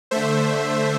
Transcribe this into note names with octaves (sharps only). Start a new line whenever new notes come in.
D3 A3 C5 E5